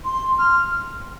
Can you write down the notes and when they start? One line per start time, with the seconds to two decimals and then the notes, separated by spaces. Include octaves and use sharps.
0.04 C6
0.39 F6